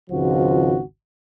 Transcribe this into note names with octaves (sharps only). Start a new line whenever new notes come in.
G#1 C#2 F3 F#4